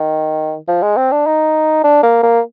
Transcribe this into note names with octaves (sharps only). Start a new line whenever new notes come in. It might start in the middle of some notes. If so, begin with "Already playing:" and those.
Already playing: D#3
F3
G#3
C4
D4
D#4
D4
A#3
A#3